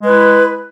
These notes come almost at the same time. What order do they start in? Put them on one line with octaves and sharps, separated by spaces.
G#3 B4 E4